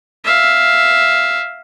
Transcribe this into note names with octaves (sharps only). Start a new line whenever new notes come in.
E5 F5